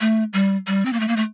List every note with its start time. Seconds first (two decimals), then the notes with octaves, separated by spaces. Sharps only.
0.01 A3
0.33 G3
0.67 G3
0.85 C4
0.93 A#3
1.00 A3
1.08 A#3
1.17 A3